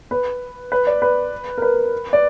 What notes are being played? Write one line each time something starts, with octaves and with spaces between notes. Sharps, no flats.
B4
B4
D5
B4
A#4
B4
D5